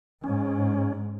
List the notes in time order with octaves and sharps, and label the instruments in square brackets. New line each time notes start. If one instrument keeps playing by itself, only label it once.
[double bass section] G#2 [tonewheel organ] C#4